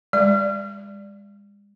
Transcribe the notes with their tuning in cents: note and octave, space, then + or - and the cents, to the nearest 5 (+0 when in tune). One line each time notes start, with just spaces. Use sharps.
G#3 -40 D5 +0